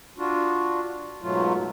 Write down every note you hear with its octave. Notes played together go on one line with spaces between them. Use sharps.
D4 F4 F#4
G#2 B2 F#3 A3 F4